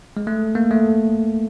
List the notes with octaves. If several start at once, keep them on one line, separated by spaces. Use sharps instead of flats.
G#3
A3
A#3
A3